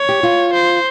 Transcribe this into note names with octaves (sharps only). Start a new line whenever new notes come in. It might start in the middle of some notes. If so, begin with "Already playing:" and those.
Already playing: C#5
G4
F4
C5